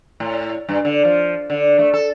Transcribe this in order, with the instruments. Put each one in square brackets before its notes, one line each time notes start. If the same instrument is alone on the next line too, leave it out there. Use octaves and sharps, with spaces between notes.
[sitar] A2
G2
D3
F3
D3
A3
A4